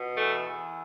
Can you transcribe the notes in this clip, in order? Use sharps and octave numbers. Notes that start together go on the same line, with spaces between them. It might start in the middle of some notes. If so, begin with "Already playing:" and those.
Already playing: B2
E2 A3
E2